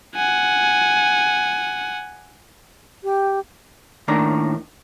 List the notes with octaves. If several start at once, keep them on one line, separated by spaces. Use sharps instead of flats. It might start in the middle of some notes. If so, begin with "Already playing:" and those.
F#5 G#5
G4
D#2 A2 D#3 D4 A#4